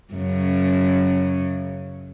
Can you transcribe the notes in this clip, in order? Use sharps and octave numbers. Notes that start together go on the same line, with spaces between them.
F#2 C#3